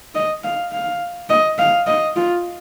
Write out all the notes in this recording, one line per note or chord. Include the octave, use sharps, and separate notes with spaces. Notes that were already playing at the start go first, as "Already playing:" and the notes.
D#5
F5
F5
D#5
F5
D#5
F4